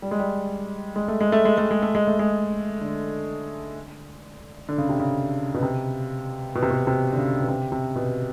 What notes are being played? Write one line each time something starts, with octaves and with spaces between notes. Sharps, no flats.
G3
G#3
G3
G#3
A3
G#3
A3
G#3
A3
G#3
A3
G#3
A3
G#3
D3
D3
C#3
C3
C#3
B2
C3
B2
C3
B2
C3
D3
C#3
B2
C3
C3
B2